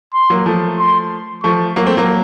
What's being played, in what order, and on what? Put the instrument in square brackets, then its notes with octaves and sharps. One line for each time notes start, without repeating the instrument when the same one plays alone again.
[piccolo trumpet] C6
[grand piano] F#3 A#3
F3 A3
[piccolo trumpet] C6
[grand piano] F3 A3 [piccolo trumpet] C#6
[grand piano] F#3 A#3
A3 C4
F#3 A#3